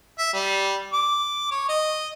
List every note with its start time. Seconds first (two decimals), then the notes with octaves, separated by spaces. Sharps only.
0.19 E5
0.34 G3
0.93 D6
1.51 C#5
1.69 D#5